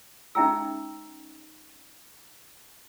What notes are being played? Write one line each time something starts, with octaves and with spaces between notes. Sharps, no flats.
C#4 D#4 E5 G5 A#5 E6